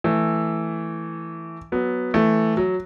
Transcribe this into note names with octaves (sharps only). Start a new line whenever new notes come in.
E3 A3
F#3 B3
E3 A3
F#3